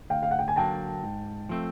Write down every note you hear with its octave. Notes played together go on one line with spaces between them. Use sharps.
D2 F5 G5
F5
F#5
G5
G#5
D3 F#3 A#3 G5 A5
G#2
F3 A3 C4